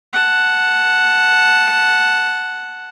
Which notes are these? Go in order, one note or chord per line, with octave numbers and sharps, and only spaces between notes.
F#5 A5